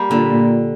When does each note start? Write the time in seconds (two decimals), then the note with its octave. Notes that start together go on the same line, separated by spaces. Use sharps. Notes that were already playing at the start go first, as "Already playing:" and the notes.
Already playing: G3 A#3
0.11 A#2 D3